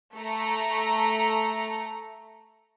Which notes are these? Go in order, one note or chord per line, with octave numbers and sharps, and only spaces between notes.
A3 A#5